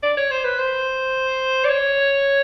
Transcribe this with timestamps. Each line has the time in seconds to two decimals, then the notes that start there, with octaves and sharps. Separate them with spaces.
0.03 D5
0.17 C#5
0.31 C5
0.44 B4
0.59 C5
1.64 D5
1.70 C#5